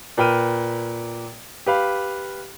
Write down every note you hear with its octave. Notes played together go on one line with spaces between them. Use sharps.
A#2 B4 G5 F6 D#7
G4 B4 F5